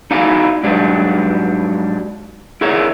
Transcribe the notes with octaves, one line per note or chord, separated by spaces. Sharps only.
D#4 E4 F#4 D5 F5 G#5
G#2 F#3 G3 D4
E4 G#4 A#4 C#5 D5 E5